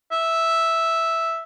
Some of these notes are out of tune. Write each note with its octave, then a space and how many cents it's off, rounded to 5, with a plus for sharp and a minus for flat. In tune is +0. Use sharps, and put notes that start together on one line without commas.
E5 -5